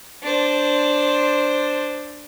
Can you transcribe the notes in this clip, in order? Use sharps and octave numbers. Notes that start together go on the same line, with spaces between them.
D4 C5